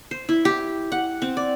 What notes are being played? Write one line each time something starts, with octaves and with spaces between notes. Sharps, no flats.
C5
E4
G4
F#5
C4
D5